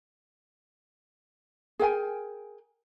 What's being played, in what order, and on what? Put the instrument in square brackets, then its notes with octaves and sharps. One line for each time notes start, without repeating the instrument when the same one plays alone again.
[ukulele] G#4 A#4 G5 G#5